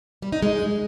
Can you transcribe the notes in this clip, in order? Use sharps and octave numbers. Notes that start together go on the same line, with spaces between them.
G3
D#4
G#3